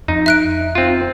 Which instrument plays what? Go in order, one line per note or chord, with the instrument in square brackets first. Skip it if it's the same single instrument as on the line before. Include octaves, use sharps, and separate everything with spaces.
[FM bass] F2 [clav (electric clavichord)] D#4
[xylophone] E5 F#6 D7
[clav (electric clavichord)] C4 F4